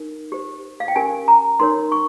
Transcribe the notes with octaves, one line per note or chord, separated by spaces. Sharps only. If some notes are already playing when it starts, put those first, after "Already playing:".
Already playing: D#4 A#4
G4 C5
F5
G5
C#4 G4 A#4 G#5
A#5
D#4 A#4 C#5 C6
C#6